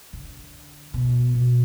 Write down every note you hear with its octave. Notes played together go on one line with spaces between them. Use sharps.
D3
B2
B2